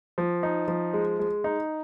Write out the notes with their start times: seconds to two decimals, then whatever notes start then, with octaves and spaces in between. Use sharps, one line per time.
0.18 F3
0.43 D#4
0.68 F3
0.93 G#3
1.19 G#3
1.44 D#4